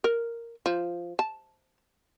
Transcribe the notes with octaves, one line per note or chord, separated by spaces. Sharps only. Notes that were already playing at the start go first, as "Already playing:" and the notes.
A#4
F3
A5